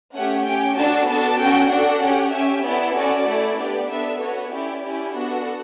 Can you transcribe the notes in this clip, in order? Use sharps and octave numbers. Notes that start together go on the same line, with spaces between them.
A3 C#4 G4 F#5
C#4 G4 G5
D4 F#4 A4 A5
B3 D4 F#4 A4 A5
C#4 F#4 A4 G5
D4 F#4 A4 F#5
C#4 G4
C#4 G4 E5
B3 E4 A4 D5
C#4 F#4 A4 D5
A3 E4 A4
B3 D4 G4 D5
B3 D4 A4 E5
B3 F#4 A4 C#5
C#4 E4 G4 D5
C#4 E4 G4
B3 D4 F#4 A4 F#5